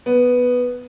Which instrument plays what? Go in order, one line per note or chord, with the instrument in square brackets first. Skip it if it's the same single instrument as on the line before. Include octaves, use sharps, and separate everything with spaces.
[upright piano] B3